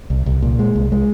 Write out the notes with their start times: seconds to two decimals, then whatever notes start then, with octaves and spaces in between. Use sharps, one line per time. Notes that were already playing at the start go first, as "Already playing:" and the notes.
0.10 C2
0.26 C2
0.42 A#2
0.59 G#3
0.76 C2
0.92 G#3